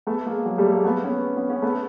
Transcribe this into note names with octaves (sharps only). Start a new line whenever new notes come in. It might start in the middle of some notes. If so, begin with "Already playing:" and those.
A3 B3
G#3 A#3
F#3 G#3
G3 A3
G#3 A#3
A3 B3
B3 C#4
B3 C#4
B3 C#4
A3 B3